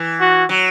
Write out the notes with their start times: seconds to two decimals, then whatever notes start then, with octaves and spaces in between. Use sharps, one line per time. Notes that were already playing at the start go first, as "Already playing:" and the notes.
Already playing: E3
0.21 F#4
0.49 F#3